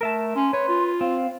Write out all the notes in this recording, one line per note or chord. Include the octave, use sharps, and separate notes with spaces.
A3 A#4 E5 A5
C#4 C6
B4 C#5
F4
C4 F5